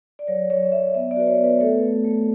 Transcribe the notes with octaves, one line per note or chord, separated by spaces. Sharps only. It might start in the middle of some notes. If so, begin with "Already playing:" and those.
D5
F#3 C#5
F#3 C#5
F#3 E5
B3 E5
D5
F#4 B4
C#5
B3
B4
A3 A4
A3
A3